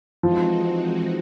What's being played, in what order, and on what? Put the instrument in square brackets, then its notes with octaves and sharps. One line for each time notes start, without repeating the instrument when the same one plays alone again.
[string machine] E3 G#3 C4 D#4 F#4 [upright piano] F3